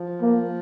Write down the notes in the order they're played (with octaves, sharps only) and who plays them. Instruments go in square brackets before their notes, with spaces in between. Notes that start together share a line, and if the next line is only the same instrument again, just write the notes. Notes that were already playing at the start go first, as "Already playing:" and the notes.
Already playing: [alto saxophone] F3
[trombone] A#3